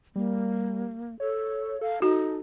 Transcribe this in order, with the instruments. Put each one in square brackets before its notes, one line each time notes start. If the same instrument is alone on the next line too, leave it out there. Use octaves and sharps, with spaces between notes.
[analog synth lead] G3 [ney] A#3
[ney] A4 [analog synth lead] C#5
[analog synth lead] A4 [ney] F5
[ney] D#4 [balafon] F#4